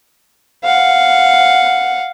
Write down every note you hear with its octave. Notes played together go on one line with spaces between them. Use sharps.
F5 F#5